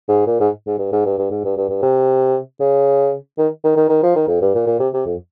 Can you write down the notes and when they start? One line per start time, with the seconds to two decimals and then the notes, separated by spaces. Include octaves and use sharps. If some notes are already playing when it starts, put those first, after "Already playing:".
0.08 G#2
0.27 A#2
0.40 G#2
0.67 G#2
0.78 G2
0.92 G#2
1.05 G2
1.18 G2
1.31 G#2
1.44 G2
1.57 G2
1.69 G2
1.82 C3
2.60 C#3
3.38 D#3
3.64 D#3
3.77 D#3
3.89 D#3
4.03 F3
4.16 D#3
4.28 F2
4.41 G2
4.55 A#2
4.67 A#2
4.79 C3
4.94 C3
5.06 F2